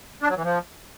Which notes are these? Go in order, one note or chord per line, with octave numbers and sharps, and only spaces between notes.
D4
F#3
E3
F3